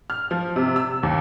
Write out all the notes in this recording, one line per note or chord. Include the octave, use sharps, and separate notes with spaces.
F6
F3
C3
E6
D#2